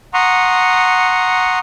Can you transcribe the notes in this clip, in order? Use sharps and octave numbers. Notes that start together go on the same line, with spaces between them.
F#5 A#5 C6 C#6 D#6